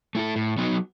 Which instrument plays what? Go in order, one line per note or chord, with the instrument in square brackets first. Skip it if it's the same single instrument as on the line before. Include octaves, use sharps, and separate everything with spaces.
[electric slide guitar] A3 E4 A4
A2
F#3 B3 D#4 F#4